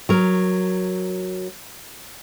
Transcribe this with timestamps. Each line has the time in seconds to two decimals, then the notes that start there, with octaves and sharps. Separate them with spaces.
0.09 F#3 A#4